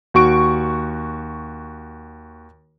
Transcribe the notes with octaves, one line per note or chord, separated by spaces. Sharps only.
D#2 F#4 C#6 D7